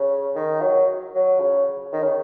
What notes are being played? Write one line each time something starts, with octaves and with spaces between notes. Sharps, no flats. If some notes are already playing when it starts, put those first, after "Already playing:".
Already playing: C#3
D#3
F#3
F#3
C#3
D#3
C#3